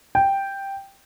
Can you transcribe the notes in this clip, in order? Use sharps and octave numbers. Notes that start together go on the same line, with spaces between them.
G5